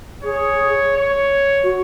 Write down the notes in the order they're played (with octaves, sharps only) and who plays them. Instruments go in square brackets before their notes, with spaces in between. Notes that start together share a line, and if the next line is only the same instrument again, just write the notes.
[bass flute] G#4 [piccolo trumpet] C#5
[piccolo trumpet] C#5
[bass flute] F#4